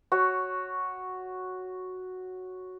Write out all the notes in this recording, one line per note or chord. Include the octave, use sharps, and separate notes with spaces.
F#4 C#5